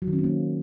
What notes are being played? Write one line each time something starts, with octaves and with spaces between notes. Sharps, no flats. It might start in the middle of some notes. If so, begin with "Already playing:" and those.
F#3
D#3
C#4
C4
A#3